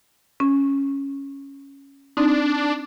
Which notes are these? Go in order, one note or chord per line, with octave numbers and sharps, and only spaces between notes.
C#4
C4 D4 D#4